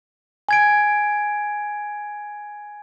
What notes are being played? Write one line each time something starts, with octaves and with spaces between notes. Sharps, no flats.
G#5 G#6 D7